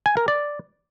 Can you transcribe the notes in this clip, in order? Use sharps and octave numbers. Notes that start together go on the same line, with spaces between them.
G#5
A#4
D5